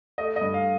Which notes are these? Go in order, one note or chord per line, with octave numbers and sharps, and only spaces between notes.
A3 D#5
D#5
G2
F5